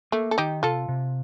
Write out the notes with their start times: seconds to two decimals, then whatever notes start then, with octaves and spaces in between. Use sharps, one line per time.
0.12 A3 A#3
0.31 A4
0.38 D#3 D#4 G4
0.63 C3 F4 A4
0.89 C3